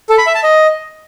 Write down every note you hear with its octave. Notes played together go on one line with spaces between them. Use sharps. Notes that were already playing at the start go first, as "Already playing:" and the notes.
A4
B5
E5
A5
D#5